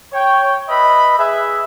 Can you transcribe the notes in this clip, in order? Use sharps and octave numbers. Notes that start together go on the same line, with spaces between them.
C#5 G5
B4 D#5 E5 B5
G#4 B4 E5